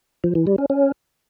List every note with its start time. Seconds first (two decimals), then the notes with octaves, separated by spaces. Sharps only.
0.24 F3
0.35 E3
0.47 G3
0.58 C#4
0.70 C#4